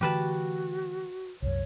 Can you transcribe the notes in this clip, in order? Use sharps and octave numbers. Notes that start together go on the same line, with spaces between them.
D3 E3 A3 F#4 G4 B4 A5
C2 F#2 C#5